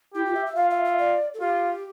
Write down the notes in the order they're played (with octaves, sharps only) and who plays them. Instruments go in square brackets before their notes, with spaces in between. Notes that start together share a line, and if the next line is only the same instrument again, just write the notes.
[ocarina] E4 [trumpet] G4
[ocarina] F4
E5
E5
[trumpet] F4 [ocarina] F5
[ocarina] E5
E5
D5
A4
[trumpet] F4 [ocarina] G4